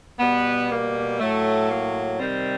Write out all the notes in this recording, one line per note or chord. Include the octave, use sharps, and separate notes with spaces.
B2 G3 B3
A#3
A2 F#3 A3
A#3
C3 D#3 G3 C4